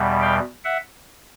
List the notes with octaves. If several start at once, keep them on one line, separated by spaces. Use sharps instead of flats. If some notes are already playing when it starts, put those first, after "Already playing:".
Already playing: E2 B2 G3
F5 G5
E5 F#5